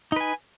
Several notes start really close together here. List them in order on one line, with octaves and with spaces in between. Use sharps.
D#4 B4 G#5